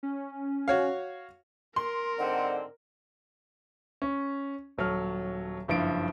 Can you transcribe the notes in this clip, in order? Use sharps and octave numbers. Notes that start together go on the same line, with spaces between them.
C#4
F#4 C#5 F5
A#4 C6
G#2 D3 C4 F#5
C#4
D#1 F#3 A4 F6
F#1 G2 F3 E4 F5 D7